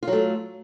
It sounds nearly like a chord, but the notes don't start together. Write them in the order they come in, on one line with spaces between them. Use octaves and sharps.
F4 F#3 A3